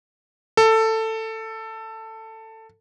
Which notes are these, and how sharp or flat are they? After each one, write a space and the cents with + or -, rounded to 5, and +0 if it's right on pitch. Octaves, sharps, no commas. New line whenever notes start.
A4 +15